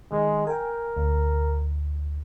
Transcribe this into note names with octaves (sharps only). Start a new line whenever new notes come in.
D#3 G#3
A#4 G5 G#5
D2